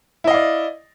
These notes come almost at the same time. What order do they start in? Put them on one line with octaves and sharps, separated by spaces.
E4 D#5 F5 D5